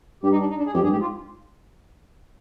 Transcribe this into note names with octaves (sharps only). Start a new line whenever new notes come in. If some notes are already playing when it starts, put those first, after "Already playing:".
G2 G4
D#4
D4
D#4
D4
G#4
F2 G4
G2 G#4
G#2 G4
F4